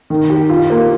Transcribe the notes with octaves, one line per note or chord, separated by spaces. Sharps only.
D#3
G4
F4
A#3